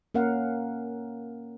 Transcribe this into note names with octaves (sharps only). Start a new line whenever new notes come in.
A#3 C#4 A#4 F5 F#5